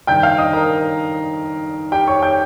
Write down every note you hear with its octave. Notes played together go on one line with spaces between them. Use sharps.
G2 D#3 G5 G6
F5 F6
D#5 D#6
A#4 A#5
G4 G5
C#5 C#6
G5 G6